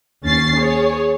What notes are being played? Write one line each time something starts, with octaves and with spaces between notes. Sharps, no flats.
D#2 C#4 A6 C7
G#4 C#5